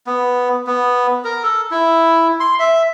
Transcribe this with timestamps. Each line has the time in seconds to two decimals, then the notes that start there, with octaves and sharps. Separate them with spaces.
0.07 B3
0.67 B3
1.24 A#4
1.43 A4
1.71 E4
2.40 C6
2.59 E5